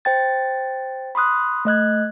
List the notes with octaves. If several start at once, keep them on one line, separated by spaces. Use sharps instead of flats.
C5 G5 A6
B5 C6 D#6 F#6
A3 D#5 F#6 G#6